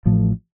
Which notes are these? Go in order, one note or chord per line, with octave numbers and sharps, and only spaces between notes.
A1 A2 F3 A3